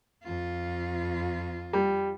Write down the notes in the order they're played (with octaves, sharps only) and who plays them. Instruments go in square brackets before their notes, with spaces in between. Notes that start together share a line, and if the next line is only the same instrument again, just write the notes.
[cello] F2 F4
[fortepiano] G3